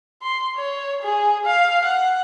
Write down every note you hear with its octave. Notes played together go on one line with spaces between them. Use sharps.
C6
C#5
G#4
F5
F#5